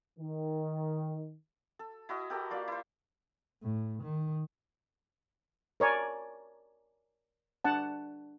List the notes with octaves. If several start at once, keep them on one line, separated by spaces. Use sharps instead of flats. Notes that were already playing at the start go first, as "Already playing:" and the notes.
D#3
A4
E4 F#4 D#5
F#4 G4 A4 A#4
A#3 F4 D5 F5
E4 C5
A2
D#3
A#4 C#5 D5 G#5
D4 F#5 A5